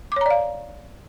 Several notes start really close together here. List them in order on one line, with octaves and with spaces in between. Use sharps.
D6 C#5 A#5 D5 F5